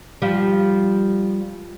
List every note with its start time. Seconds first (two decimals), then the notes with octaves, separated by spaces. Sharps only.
0.22 F3 G3